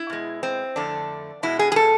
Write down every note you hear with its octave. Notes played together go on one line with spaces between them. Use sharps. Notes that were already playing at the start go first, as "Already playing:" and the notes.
Already playing: E4
B2 G#3
C4
F2 D3 A3 D4
B2 G#3 E4
G#4
G#4
A4